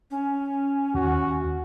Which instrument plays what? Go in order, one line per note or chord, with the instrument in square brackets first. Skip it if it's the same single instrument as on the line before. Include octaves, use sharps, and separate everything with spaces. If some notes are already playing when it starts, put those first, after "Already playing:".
[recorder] C#4
[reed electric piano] D#2 [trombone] F#4